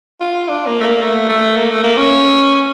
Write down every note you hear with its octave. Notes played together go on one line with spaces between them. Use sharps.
F4
D4
A#3
A3
A#3
A3
A3
A#3
A3
A#3
C#4